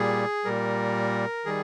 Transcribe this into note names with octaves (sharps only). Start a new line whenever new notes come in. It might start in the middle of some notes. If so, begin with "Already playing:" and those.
Already playing: A#2 G3 G#4
A#2 G3 A#4
D#3 G3 G#4